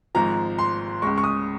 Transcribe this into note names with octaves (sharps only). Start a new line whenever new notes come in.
G#1 G#2 F3 A#5
C6
C#2 C#3 G#3 C#6
C#6
D#6